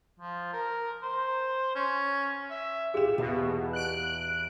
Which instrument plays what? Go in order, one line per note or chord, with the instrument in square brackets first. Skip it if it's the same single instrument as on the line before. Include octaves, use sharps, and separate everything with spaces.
[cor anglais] F3
A#4
C5
C#4
E5
[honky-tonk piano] F4 G4 E7 [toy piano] G#4
[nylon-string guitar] E2 [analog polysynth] B2
[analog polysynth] F#6 D7